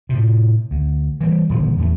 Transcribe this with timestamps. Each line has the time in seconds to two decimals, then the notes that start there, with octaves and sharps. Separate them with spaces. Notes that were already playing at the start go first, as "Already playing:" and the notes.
0.09 A2 C3
0.71 D2
1.21 E3 G3
1.49 D#1 D3 F3
1.78 E2 A3